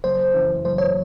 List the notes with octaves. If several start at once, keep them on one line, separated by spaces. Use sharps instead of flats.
F#1 C5
F#2 C#3 E3
F#1 C5
C#5